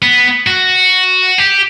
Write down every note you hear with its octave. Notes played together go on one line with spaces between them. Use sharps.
B3
F#4
G4